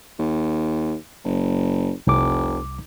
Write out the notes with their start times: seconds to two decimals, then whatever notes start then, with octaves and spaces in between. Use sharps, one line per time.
0.19 D#2
1.24 F#1
2.07 F1 C2 D6